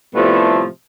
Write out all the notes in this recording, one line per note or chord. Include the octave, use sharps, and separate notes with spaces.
A2 C3 F3 G3 A3 B3